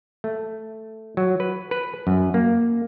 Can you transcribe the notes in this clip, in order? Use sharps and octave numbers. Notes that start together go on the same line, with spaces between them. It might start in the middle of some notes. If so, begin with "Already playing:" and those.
A3
F#3
B4
B4
F#2
A#3